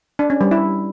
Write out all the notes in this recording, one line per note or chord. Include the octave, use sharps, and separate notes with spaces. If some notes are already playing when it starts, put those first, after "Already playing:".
D4
C#4
G3
E4